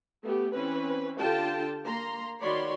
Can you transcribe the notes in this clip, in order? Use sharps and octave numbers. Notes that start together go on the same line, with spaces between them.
A3 B3 G4
E3 C4 C#4 B4
D3 F4 G4 G5 A5
A#3 A#5 C6
D#3 F#4 C#5 D5 B5 C6